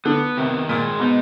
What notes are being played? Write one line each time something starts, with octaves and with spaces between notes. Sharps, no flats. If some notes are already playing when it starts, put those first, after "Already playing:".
D3 B3
C3 D#3
A#2 G#3
B2 D#4